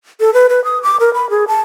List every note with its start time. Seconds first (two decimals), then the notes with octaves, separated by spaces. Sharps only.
0.20 A4
0.34 B4
0.49 B4
0.64 D#6
0.83 D6
1.00 A#4
1.14 B5
1.30 G#4
1.48 A5